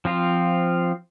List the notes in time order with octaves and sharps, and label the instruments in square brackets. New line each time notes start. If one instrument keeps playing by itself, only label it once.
[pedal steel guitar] F3 C4 F4